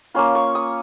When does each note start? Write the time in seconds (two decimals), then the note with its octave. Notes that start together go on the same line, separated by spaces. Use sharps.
0.14 A#3 C#4 F4 C6
0.35 C#6
0.55 D#6